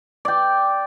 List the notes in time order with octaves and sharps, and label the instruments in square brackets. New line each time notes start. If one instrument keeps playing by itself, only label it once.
[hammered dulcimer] D5 G5